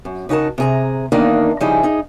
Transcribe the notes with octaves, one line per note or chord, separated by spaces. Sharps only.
F#2
C#3 D#4 F#4 A#4 A5
C3 G#4 A#5
E2 D#3 A#3 D4 D#4 F5
C#3 F3 G3 D#4 E4 G#4
D#4 G#4